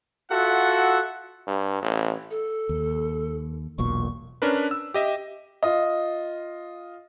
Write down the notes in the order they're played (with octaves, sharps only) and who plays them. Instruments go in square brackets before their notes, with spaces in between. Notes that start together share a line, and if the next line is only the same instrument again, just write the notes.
[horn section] F4 F#4 A4 E5 F#5
[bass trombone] G2
A1
[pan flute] A4
[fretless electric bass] D#2
[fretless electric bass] E1 B1 A#2 [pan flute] C#6
[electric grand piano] C#4 D4 A#4 B4
E6
G4 D#5 E5
[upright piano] F4 D#5